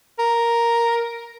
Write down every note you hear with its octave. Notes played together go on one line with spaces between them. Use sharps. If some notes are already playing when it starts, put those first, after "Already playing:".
A#4